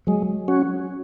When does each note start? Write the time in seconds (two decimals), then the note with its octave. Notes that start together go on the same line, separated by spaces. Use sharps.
0.07 F#3 G#3
0.48 C#4 F#4